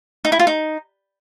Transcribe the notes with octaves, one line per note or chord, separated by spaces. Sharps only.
D#4
E4
F4
D#4